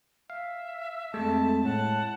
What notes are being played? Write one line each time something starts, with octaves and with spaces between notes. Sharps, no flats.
E5 F5
F2 G#3 A3 A5
A2 F#5 A5